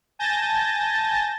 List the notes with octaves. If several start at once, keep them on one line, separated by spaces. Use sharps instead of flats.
G#5 A5 G6 A6 A#6